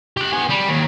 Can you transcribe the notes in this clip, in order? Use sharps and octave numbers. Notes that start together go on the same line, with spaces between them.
G4 F#5
B3 G#5
G3
D#2